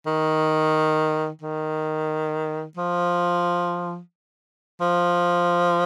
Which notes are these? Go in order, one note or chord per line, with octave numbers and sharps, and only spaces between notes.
D#3
D#3
F3
F3